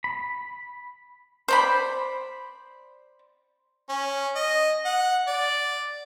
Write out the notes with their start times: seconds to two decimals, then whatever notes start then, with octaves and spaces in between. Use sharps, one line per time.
0.04 B5
1.48 C5 D5 B5
3.89 C#4
4.35 D#5
4.85 F#5
5.27 D5